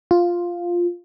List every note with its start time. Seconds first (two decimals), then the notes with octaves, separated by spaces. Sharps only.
0.11 F4